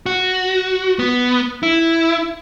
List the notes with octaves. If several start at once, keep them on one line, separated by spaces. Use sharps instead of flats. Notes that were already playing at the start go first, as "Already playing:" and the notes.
F#4
B3
E4